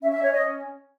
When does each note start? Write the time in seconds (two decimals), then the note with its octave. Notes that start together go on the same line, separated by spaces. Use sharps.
0.02 C#4 E5
0.12 C#4 E5
0.22 C#5
0.32 C#4 D#5